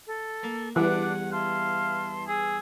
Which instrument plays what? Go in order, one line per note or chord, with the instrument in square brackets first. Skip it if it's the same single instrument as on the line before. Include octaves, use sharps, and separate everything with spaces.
[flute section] A4
[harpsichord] A#3
[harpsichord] E2 G2 [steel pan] E3 [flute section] D4 D6 F#6 [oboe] F#5
[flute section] E4 A5 C6 [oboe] F5
[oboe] G#4 [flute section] E6